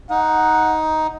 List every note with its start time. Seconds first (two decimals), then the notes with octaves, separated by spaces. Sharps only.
0.10 D#4 F#5